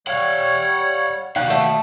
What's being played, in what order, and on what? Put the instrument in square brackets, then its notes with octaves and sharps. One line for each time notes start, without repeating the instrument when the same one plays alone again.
[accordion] G3 C#5 [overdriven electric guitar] F5 F#5
[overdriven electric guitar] D#3 F5 [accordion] G3 [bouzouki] F#4
[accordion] B2 E5 [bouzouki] A3